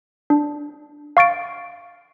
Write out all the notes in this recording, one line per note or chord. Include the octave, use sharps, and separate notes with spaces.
D4
F5 C#6 A6 D7